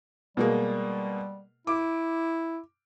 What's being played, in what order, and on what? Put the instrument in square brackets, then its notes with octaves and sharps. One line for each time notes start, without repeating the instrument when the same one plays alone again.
[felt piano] B2 G#3 A#3 [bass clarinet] G3
[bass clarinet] E4 [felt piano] D6